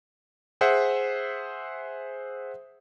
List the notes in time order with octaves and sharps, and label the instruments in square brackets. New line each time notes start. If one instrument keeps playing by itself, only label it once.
[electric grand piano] G#4 C5 E5 F#5